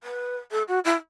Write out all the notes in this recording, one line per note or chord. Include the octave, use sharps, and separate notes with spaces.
B4
A4
F#4
E4